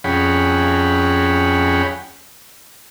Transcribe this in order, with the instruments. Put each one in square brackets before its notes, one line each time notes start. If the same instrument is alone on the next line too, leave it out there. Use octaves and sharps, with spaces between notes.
[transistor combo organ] F2 C#4 G#4 F#5 G5 B5